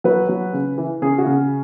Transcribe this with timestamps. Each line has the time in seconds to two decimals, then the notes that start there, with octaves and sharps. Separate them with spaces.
0.04 F#3 B4
0.29 F#3
0.53 C#3
0.78 E3
1.02 C#3 G#4
1.18 F#4
1.26 C#3